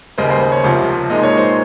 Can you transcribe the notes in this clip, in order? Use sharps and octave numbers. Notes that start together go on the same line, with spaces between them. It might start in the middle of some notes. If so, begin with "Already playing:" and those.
D#2 C#3 G3 C5 D#5
C5 D#5
C5
C#5
C2 C3 F3
A#2 G#3 D#4 D#5
C#5
C5